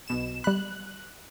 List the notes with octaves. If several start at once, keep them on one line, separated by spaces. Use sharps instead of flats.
B1 B2 E7
G3 B5 F#6